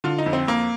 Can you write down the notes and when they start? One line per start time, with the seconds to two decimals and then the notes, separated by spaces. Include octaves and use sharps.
0.04 D3 F4
0.18 D#4
0.26 F2
0.33 C4
0.47 F2 A#3